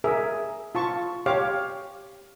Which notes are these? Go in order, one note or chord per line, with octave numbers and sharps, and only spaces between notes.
G#4 A#4 E5
F4 A5 C#6
G4 C#5 F5 D6